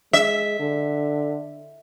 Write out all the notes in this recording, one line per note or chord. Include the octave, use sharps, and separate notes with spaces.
G#3 E5
D3